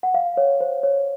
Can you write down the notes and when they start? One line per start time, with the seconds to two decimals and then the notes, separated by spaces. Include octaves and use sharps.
0.03 F#5
0.14 F5
0.37 C#5
0.60 C5
0.83 C#5